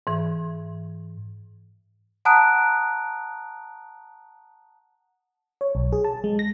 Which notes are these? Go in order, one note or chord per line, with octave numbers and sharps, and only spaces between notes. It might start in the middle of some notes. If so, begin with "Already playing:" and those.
G#2 E3
F#5 A5 A#5 D#6 F#6 D7
C#5
B1
G#4
A5
G#3
A#6